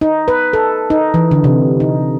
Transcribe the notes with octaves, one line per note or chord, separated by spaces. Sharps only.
D#4
B4
A4
D#4
E3
D3
C3
D#4